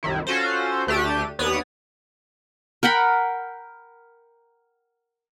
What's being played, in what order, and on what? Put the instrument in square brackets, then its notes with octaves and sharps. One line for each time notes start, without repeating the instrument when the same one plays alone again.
[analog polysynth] C2 F#2 D#3 E4
C#4 F4 F#4 A4 C5
D2 A3 D4 G4 D#7
D#2 B3 B4 C#5 D5 D#6
[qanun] A#4 F#5 G5 B5